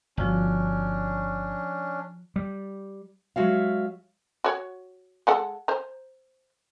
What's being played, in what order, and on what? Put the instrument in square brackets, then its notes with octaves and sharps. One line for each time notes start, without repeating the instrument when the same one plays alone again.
[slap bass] G1 [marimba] F3 F4 F#4 [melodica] C#4 D4
[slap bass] G3
[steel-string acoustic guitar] F#3 G#3 F#4 E5 F5
[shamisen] F#4 C#5
G#3 A4 F#5
C5 A#5